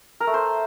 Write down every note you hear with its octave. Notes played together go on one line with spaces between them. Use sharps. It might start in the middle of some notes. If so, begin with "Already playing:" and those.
A#4
A3
C5